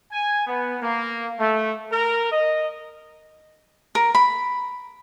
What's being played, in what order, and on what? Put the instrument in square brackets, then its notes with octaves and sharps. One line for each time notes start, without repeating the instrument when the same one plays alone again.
[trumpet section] G#5
B3
A#3
A3
A#4
D#5
[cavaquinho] A#4
B5